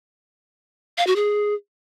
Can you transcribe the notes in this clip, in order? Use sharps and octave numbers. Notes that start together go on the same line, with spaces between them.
F5
F#4
G#4